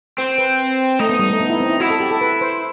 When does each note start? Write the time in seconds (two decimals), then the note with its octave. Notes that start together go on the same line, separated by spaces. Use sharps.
0.18 C4 C5
0.38 B4
0.99 A3 D#4
1.09 B3
1.19 G3
1.30 A3
1.40 B3
1.50 E4
1.60 C4
1.70 E4
1.80 E4 F#4
1.90 A4
2.00 G4
2.11 A4
2.21 B4
2.41 C5